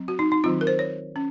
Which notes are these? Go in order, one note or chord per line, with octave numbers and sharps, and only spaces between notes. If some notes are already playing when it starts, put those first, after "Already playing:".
Already playing: F#3 C4
F#4
D#4
D#4
D#3 F#3 C4 F4
A#4
C5
C#5
C#4